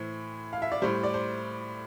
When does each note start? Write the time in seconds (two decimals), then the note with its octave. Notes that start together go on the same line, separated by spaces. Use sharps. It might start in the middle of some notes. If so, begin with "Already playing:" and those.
Already playing: A2 E3 C5
0.53 F5
0.62 E5
0.72 D5
0.82 A2 G3 C5
1.04 D5
1.14 C5